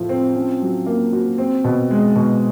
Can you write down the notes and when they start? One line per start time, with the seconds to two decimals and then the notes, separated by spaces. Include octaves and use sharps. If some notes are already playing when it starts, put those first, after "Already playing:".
Already playing: A2 F3 A3
0.09 C4
0.36 C#4
0.61 F#3
0.86 A#3
1.13 F#4
1.38 C4
1.64 B2
1.91 G#3
2.15 B2